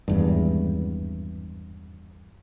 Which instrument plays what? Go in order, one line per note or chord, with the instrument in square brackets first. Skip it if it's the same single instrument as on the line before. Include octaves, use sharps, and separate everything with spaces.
[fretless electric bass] G#1 E2 G2